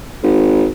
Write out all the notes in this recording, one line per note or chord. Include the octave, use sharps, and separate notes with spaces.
G#1